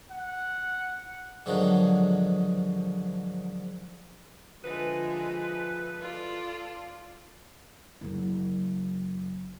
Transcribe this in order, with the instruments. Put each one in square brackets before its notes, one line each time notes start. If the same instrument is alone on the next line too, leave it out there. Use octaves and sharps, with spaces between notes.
[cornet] F#5
[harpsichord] G#2 D3 D#3 F3 F#3 G#3
[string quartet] D3 G#3 [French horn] F3 [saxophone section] A3 D#4 B4
[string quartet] F4 A4 D5
[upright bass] F#1 F#3